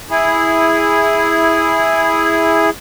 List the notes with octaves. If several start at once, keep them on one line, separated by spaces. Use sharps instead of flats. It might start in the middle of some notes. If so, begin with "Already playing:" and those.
E4 G#4